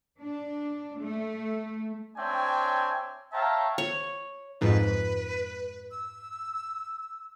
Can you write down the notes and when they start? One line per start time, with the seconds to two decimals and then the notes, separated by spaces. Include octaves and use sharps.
0.20 D4
0.99 A3
2.17 C4 D4 C#5 E5 G5 G#5
3.33 C#5 E5 F5 G5 A5 A#5
3.78 C#5
4.61 F2 G#2 B4
5.91 E6